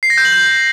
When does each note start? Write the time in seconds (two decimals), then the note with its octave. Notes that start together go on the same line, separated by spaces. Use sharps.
0.03 C7
0.10 A#6
0.18 G6
0.25 F#7
0.32 G6